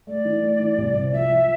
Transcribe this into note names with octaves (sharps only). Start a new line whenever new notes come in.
A3 D5
E3
A3
E3
C2
C3
F3 E5
F3